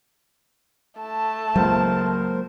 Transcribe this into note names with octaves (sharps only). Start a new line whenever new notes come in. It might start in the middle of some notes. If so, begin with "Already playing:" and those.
A3 A5
C#2 F#3 A#3 A#4 C5